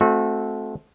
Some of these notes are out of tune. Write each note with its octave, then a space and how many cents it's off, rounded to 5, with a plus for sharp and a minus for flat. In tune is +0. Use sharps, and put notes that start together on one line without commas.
A3 -20 C4 +0 F#4 -35